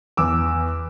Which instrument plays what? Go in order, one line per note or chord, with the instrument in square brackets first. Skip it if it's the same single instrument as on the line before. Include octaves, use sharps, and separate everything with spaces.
[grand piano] E2 D6 E6